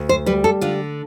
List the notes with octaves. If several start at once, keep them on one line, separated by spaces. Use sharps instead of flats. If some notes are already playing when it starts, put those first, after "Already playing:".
Already playing: D2
C5
G3 B4
A4
D3 F4